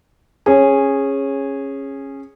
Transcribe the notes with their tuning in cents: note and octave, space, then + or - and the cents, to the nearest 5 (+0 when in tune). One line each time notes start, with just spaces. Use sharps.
C#4 -15 G#4 -10